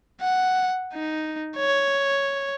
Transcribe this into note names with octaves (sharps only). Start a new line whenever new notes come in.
F#5
D#4
C#5